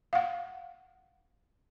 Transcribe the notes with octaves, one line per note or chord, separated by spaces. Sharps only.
F5 F#5